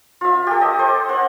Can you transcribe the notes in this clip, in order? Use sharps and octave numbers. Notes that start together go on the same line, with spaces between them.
F4 E5
G4 A4
D#5
C5
C5 F#5